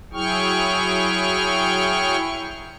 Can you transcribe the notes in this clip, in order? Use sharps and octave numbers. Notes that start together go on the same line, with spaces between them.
F#3 E4 G#4 G5 C#6 F6